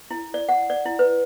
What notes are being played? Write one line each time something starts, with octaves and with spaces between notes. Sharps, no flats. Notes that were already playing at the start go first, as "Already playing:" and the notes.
E4
D5
F#5
D5
E4
B4